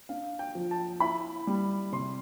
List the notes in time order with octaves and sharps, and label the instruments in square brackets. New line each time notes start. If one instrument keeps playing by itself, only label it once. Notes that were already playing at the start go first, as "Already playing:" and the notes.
[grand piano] D4 F5
G5
F3
A5
E4 B5
G3
C3 C6